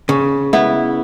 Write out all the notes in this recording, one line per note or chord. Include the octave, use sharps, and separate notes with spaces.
C#3
B3 E4